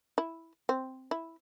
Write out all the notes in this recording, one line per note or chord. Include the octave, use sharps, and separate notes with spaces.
E4
C4
E4